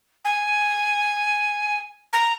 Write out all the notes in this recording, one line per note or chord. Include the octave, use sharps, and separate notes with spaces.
G#5
A#5